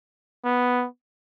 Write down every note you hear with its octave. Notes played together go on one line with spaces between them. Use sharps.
B3